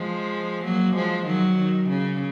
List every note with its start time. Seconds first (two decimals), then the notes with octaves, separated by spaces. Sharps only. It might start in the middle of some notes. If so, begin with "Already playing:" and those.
Already playing: F3 G#3
0.65 F#3 A#3
0.96 F3 G#3
1.27 D#3 F#3
1.58 D#3
1.90 C#3